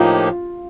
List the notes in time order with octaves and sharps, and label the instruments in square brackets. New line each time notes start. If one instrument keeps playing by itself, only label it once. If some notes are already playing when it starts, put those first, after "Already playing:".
Already playing: [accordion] A2 F3 A#3 D#4 G4 [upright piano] F4